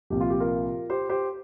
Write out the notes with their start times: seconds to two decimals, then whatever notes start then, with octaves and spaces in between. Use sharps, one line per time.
0.10 C2 A#2 F3 G4
0.21 F4
0.30 G4
0.40 F4 A#4
0.90 G4 C5
1.09 G4 C5